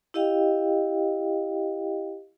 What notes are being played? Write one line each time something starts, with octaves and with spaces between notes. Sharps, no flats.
E4 G4 D#5 F5 G5